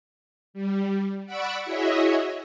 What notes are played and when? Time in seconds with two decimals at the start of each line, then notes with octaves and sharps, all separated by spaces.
0.54 G3
1.26 D5 F#5 B5 C#6 D6 E6
1.65 E4 F#4 G#4 C#5 D#5 E5